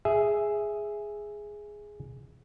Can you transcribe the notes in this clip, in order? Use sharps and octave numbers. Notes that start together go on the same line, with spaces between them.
G#4 E5